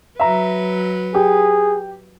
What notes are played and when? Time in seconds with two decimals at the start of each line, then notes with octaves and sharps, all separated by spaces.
0.20 F#3 B4 E5 A#5
1.15 G4 G#4